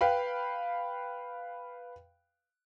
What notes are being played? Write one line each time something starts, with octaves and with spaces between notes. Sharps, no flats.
B4 F5 G5 B5